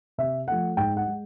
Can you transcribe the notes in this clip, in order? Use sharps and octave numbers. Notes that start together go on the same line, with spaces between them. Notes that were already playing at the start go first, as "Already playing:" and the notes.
C3 E5
F3 A3 F#5
G#2 G5
F#5
G#3